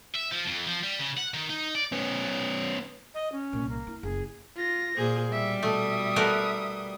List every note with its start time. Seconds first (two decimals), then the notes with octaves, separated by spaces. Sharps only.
0.15 E5
0.32 F3
0.48 F2
0.67 F3
0.84 G3
0.99 C#3
1.17 F#5
1.34 D#3
1.50 D#4
1.75 D5
1.92 B3 C#4
3.14 D#5
3.32 C#4
3.53 C2 A#2
3.69 A#3
3.87 E4
4.03 F#1 G#4
4.56 F4 A#6
4.97 A#2 G#4 C5
5.32 B2 G3 E5
5.63 A3 E5 D#6
6.16 A3 B3 A#4